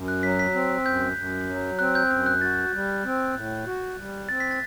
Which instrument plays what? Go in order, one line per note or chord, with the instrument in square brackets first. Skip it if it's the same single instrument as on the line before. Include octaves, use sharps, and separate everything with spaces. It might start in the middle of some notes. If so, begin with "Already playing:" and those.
Already playing: [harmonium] F#2
[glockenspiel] F#6
[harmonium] F#3 [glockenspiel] B6
[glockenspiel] B6
[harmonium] C4
[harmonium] F#2 [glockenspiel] G6
[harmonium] F#2
F#3
[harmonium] C4 [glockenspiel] F#6
[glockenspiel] G6
[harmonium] F#2 [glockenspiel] G6
[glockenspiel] F#6
[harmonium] F#4 [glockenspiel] A6
[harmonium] G3
C4
A2
F#4
G3
[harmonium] C4 [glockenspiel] A6
[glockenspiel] B6
A6